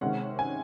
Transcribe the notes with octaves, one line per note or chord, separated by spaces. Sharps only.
C3 D#3 G#3 C#4 F#5
G#5